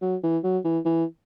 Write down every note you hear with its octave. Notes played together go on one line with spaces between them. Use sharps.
F#3
E3
F#3
E3
E3